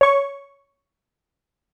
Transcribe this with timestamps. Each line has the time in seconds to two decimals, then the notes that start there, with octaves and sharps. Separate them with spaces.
0.01 C#5 C#6